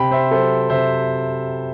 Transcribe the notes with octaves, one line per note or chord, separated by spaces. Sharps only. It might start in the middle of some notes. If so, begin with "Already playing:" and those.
Already playing: C3 G5 B5
C5 E5
F#3 A4 C5
C3 C5 E5